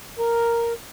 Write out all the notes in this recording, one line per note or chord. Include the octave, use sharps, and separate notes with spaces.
A#4